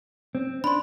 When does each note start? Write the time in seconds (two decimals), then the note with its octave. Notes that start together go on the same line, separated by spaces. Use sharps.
0.35 C4
0.64 D4 B5 C6